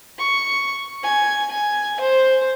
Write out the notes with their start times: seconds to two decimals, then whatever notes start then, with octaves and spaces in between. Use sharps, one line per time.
0.18 C#6
1.03 G#5
1.50 G#5
2.00 C5